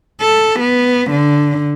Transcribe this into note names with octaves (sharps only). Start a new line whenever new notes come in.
A4
B3
D3